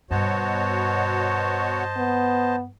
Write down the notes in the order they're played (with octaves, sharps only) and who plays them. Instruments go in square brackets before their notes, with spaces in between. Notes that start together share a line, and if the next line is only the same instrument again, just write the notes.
[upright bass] G2 [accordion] B2 F#4 C#5 [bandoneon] C5 D#5 A5
[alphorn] B3